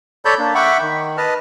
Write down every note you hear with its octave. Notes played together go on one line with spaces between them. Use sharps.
A4 C#5 D5 A5 B5 G6
A#3 D4
E5 F#5 G5 B5 C#6 D6
D#3
B4 D#5 A5 F6